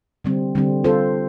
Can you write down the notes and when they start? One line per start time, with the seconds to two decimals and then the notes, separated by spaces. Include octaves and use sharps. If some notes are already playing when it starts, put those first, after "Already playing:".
0.25 D3 G3 C4
0.55 D3 G3 C4
0.84 C4 F4 A4 C5